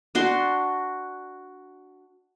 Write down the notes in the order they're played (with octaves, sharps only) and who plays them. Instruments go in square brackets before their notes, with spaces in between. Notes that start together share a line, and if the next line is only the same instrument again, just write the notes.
[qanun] D4 F#4 C6